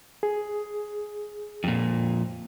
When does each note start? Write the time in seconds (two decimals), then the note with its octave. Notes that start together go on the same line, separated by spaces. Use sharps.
0.23 G#4
1.64 F2 A#2